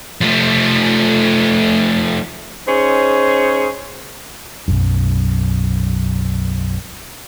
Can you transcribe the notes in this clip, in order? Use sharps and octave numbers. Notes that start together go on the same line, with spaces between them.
F3 A3
C#4 D#4 G#4 C5 C#5
B1 F#2